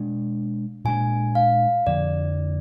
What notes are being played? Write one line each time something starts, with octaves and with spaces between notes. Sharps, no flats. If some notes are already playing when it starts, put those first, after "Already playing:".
Already playing: B2 G#3 D4
A#2 G#3 D4 G#5
F5
F2 D3 F3 D5